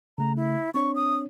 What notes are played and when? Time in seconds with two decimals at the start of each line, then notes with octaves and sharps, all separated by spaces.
0.18 C#3 A3 A#5
0.36 E4
0.74 C4 D4 C#5 C#6
0.95 D#6